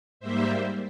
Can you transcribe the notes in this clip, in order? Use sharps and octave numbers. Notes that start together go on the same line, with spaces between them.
G#2 G3 A#3 C5 E5